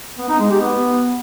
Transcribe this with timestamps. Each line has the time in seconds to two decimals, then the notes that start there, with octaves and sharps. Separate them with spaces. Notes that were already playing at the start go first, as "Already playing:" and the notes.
0.18 B3
0.29 D#4
0.40 G#3
0.50 G4
0.61 B3